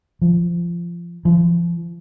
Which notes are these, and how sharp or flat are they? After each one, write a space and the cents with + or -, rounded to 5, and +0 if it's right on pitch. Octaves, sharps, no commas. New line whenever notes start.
F3 -20
F3 -35